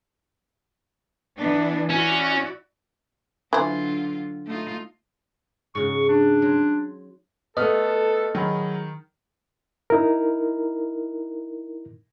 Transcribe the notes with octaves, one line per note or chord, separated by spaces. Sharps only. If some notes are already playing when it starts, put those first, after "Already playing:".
E3 B3 D4
C#4 E4 F#4 D5
D3 E3 F#3 F4 C5
A3 D#4 F4
G#2 C#3 F#4 C#6
D4
F#3 C5
A3 B3 A4 D#5 D#6 F6
D#3 F#3 G#4 B5
D#4 E4 A#4